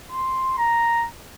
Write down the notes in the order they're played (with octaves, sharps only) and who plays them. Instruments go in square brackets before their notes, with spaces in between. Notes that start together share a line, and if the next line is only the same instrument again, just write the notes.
[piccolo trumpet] C6
A#5